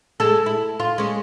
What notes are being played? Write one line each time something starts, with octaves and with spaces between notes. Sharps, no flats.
G#3 A4
E4
F4
G#3 C#4